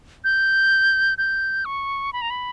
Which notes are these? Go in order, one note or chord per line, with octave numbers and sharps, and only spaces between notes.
G6
G6
C#6
B5
A#5
B5